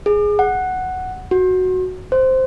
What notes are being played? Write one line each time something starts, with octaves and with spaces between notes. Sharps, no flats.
G#4
F#5
F#4
C5